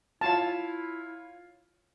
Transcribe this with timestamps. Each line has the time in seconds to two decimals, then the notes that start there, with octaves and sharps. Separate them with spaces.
0.21 E4 F4 C#5 F5 A5